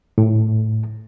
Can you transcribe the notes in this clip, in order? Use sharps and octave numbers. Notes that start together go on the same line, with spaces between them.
A2